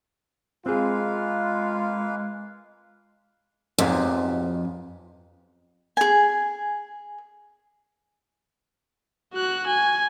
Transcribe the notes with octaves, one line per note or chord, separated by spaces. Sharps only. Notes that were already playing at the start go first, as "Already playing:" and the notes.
G#3 A#3 C4 F4 G#4 B4 F5
B1 F2 G#2 C3
G#4 G#5
F#4 F#6
G#5